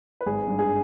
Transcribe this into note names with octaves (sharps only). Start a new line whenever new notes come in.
B4
G#1 G#4
G2
G#4